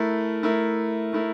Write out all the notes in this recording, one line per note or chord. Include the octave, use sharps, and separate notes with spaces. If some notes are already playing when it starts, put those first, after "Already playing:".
Already playing: A3 E4 A#4
A3 E4 A#4
A3 E4 A#4